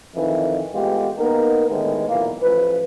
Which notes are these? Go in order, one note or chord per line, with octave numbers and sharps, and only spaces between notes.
F2 D#3 E3
G#3 A3 B3 F4 G4
A#3 B3 D#4 A#4
A2 D3 D#3 G#3 B3
B1 A#2 E3 A#3
A1 F3 B4